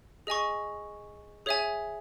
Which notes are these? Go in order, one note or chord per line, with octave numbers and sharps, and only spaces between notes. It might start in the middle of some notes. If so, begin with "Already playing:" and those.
G#4 D#5 G#5 C#6
G#4 C#5 E5 G#5